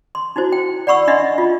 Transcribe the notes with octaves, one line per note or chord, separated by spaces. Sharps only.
C6
D#4 E4 F#4 C5
G5
D5 F#5 B5 C#6 E6
D4 D#5 E5 F#5 C6
F4